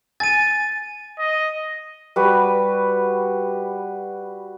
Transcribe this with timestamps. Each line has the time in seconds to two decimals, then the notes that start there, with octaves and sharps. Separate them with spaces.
0.20 G#5 A6 D#7
1.19 D#5
2.16 G3 F#4 B4